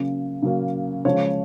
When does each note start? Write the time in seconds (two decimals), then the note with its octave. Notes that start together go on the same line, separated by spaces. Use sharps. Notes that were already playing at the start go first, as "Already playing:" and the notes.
Already playing: C#3 F#3 A#3 C#4
0.42 C#3 F#3 A#3 C#4
1.05 C#3 F3 G#3 C#5